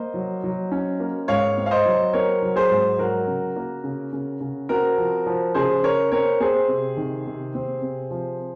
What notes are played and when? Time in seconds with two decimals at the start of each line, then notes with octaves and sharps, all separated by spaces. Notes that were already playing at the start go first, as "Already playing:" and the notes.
Already playing: A#3 C5 D#5
0.14 F#3
0.44 F#3
0.72 C#4
1.00 A#3
1.28 G#2 C#5 F5
1.57 C4
1.66 F5
1.71 C5 D#5
1.86 F#3
2.13 C4 A#4 C#5
2.42 F#3
2.56 G#4 C5
2.70 G#2
2.99 F#3 F#4 A#4
3.27 C#3
3.56 A#3
3.84 C#3
4.13 C#3
4.41 C#3
4.69 C4 F#4 A#4
4.98 F3
5.26 F3
5.55 C#3 G#4 C5
5.83 C#3 A#4 C#5
6.12 C4 A#4 C#5
6.40 C4 G#4 C5
6.68 C3
6.97 D#3
7.26 C3
7.55 C4
7.82 C3
8.11 F3